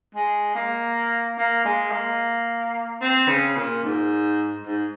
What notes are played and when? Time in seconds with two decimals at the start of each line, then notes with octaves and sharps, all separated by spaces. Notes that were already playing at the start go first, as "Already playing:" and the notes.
0.15 G#3
0.55 A#3
1.38 A#3
1.65 G#3
1.92 A#3
3.01 C4
3.28 C#3
3.56 A#2
3.84 G#2
4.66 G#2